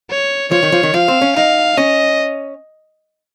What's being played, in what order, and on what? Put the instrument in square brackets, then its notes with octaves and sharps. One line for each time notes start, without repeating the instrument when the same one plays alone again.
[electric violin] C#5
[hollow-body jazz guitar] F3 [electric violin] C#5
[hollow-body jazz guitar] D#3
F3
D#3
[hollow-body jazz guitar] F3 [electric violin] F5
[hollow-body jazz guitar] C4
C#4
[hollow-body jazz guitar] D#4 [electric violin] F5
[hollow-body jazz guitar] C#4 [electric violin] D#5